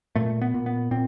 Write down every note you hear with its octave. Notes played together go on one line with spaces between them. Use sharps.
A#2 A3
B3
A#2
B3
A#2 C4